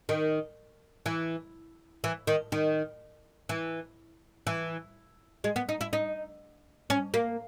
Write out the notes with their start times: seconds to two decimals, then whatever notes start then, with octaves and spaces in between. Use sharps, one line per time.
0.09 D#3
1.06 E3
2.04 E3
2.27 D#3
2.52 D#3
3.49 E3
4.47 E3
5.44 G#3
5.56 B3
5.69 D#4
5.81 E4
5.93 D#4
6.90 C#4
7.14 A#3